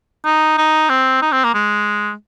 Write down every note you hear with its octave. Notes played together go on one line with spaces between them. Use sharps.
D#4
D#4
C4
D#4
C4
A#3
G#3